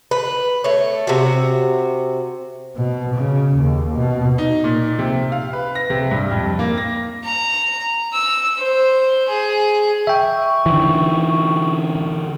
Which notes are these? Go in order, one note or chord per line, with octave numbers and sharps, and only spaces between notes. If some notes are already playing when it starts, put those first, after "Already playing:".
B4
A3 C#5
C3 F#4
B2
C#3
D#2
B2
D#4
A#2
C3
F5
B4
A#6
C3
G2
F2
A#3
A#6
A#5
E6
C5
G#4
E5 G5 C#6
D3 E3